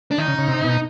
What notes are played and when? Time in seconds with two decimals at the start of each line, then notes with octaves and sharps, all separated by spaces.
0.11 D4
0.18 D#3 D#4
0.28 C#3
0.38 C#3
0.48 C3
0.64 B2